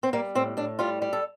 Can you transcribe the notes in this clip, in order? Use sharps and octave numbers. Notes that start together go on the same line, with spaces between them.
C4
G3 A#3
A2 C4
A2 D4
G3 F4
G3
A4